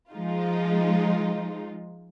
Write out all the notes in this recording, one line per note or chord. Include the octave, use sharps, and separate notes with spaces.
F3 G#3 D#4 F4